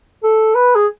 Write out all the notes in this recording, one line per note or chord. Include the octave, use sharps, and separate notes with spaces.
A4
B4
G#4